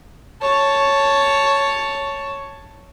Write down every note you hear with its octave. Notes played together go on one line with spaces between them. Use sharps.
C#5 A5